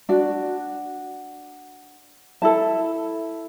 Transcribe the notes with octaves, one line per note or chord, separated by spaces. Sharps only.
D4 F#4
E4 A4 A5